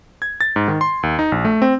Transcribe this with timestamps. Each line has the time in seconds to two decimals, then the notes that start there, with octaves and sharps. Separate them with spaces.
0.22 G#6
0.41 A6
0.56 G#2
0.68 D#3
0.81 C6
1.03 D#2
1.19 D#4
1.32 A#1
1.45 A3
1.62 C4